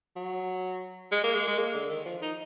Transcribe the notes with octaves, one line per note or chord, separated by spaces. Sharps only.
F#3
G#3
A#3
G#3
G#3
A#3
D3
D#3
F3
D#4